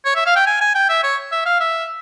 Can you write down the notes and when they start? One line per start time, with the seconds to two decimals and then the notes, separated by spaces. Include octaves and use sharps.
0.05 C#5
0.16 E5
0.26 F5
0.36 G5
0.47 G#5
0.61 G#5
0.75 G5
0.89 E5
1.03 C#5
1.32 E5
1.46 F5
1.60 E5